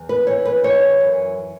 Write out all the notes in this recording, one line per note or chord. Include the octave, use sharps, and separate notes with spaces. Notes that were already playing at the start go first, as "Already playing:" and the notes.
Already playing: E2
B4
E3 C#5
B4
E3 C#5
F#2